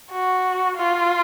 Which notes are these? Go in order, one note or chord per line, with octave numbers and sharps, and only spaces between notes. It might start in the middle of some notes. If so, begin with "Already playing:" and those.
F#4
F4